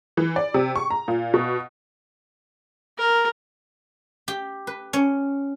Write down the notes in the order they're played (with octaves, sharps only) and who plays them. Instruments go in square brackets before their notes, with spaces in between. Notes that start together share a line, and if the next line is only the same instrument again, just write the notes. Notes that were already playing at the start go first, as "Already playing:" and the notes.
[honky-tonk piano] E3
D5
C3
C#6
A#5
A#2
B2
[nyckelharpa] A#4
[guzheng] G4
B4
C#4